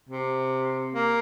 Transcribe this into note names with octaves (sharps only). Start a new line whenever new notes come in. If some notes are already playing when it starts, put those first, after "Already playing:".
C3
A#3